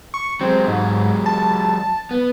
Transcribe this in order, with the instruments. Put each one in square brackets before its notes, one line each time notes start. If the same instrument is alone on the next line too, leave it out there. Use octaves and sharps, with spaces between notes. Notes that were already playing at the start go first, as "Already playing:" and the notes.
[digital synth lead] C#6
[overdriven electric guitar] F#3 G#3 [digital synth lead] C4
[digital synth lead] G#2
A5
[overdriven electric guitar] B3